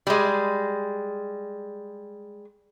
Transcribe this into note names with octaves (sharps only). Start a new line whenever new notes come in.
G3 G#3